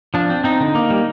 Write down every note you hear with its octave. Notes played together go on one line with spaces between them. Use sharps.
F3 D4
C4
C4 D#4
D3
A#3
G3